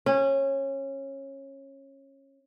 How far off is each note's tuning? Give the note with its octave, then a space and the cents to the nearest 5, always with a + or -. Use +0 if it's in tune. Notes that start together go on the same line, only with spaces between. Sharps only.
C#4 -20